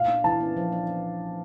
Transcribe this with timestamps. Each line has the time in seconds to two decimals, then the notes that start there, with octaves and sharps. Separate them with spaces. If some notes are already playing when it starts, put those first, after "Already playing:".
Already playing: A#2 F5
0.08 D4
0.24 E3 A5
0.40 C#4
0.57 F3
0.72 D4